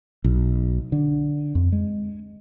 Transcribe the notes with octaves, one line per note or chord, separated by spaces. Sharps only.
B1
D3
F2
G#3